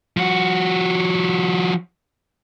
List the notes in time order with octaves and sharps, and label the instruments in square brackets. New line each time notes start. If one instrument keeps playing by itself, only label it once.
[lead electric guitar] F3 F#4